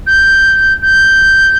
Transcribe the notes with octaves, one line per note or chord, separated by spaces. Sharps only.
G6
G6